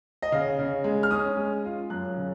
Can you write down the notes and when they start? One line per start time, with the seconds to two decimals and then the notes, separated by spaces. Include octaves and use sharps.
0.22 D#5
0.32 C#3 F5
0.59 C#3
0.84 G#3
1.03 F6
1.11 C#4 D#6
1.37 G#3
1.65 F4
1.90 F#2 F#6
2.17 C#3